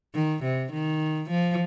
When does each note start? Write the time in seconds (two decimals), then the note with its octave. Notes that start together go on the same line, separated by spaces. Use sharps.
0.15 D#3
0.43 C3
0.72 D#3
1.30 F3